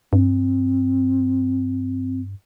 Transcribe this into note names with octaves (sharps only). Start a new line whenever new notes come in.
G2 C4